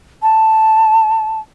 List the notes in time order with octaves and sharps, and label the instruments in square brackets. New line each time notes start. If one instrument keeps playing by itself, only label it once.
[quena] A5